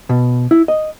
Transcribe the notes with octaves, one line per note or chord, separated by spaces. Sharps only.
B2
E4
D#5